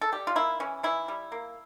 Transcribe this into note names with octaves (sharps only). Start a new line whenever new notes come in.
A4
G3 G4
F4
A#3 E4
E3 C#4
E3 E4
G3
A#3